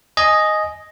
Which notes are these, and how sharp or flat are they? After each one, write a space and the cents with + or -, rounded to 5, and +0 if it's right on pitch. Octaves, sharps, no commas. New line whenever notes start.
D#5 +0 G#5 +10